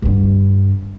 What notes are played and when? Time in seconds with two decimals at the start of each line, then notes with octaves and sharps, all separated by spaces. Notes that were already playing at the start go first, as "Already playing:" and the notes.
0.02 G2 D3